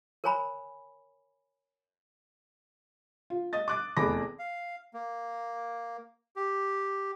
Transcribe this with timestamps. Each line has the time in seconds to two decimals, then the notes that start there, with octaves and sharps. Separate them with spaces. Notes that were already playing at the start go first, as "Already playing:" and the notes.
0.24 A#4 C5 C#5 G#5 A#5 B5
3.30 F4
3.53 D#5 D#6 A6
3.68 D6 F#6 A6
3.97 F1 E2 G#4 B5 D6 A#6
4.39 F5
4.93 A#3
6.36 G4